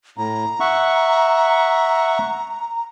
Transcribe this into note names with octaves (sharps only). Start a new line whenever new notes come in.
A2 A#5
E5 F#5 C#6